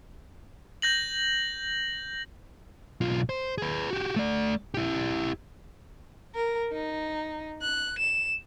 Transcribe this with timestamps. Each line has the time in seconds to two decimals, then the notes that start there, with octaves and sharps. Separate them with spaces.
0.82 G6 A#6 F#7
3.01 B1 F4
3.29 C5
3.58 G#4 B4
3.91 F#4 G4
4.16 A3 D5
4.74 E4 G4
6.35 A#4
6.72 D#4
7.62 F#6
7.99 E7